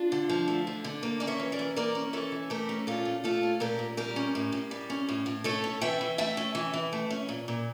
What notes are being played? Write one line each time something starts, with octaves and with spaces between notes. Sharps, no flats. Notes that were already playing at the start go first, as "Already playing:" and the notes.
Already playing: D4 F4
D3
F3
A3
D3
D3
A#3
C#4 D5
C#5 E5
E3
A#4 D5
E3
A#3 A#4 D5
C#4
E3 A4 C#5
E3
A3 G4 A#4
C#4
A#2 F4 A4
A#2
A3 F4 A4
C#4
A#2 G4 A#4
A#2
G3 G4 A#4
C#4
A2
A2
G3
C#4
A2
A2
A3 A4 C#5
C#4
E3 E5 G5
E3
A3 E5 G5
C#4
E3
E3
A3
C#4
A#2
A#2